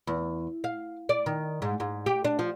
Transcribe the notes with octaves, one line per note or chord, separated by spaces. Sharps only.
E2
F5
D5
D#3
G#2
G#2
G4
D4
F3